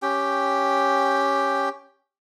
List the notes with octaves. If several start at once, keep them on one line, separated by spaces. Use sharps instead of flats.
C#4 G4 G5